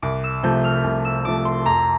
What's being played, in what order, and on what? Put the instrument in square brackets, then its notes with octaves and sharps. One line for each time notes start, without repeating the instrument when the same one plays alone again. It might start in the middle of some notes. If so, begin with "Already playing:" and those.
[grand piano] C2 [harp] D6
[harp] E6
[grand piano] C3 F3 A3 [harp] G6
[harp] F6
[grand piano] C2
[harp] E6
[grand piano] C3 F3 A3 [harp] D6
[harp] C6
[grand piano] F2 [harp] A#5